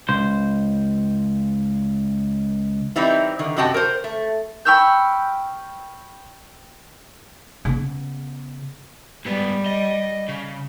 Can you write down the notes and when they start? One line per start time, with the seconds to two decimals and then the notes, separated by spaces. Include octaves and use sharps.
0.09 C#2 C5
2.96 E3 G3 C4 D#4 E4
3.39 D3 D#3
3.57 F#2 C3 F#4 D#5 G5 A5
3.74 A#4 C5
4.04 A3
4.65 G5 B5 C#6 E6 F6 G6
7.65 C#3 B3
9.25 G#2 G3 B3
9.66 D#5
10.28 C#3